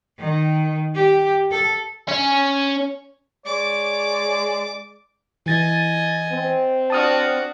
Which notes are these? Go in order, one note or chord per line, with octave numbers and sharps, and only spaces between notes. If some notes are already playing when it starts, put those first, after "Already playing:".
D#3
G4
A4
C#4
G#3 C#5 D5 D6
E3 D#5 G#5 A6
C4
D4 F#4 A5 D#6 F6